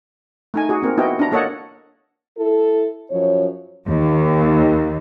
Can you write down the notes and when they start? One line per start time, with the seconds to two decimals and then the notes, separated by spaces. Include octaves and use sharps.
0.54 A3 D#4 G#5
0.69 F#4 G#4
0.82 A#3 C4 A#4
0.98 B3 E4 F#4 D#5 G5
1.19 D4 E4 A#5
1.32 A#3 A4 C#5 D#5 F#5
2.38 E4 A4
3.11 F#2 F3 C#5
3.87 D#2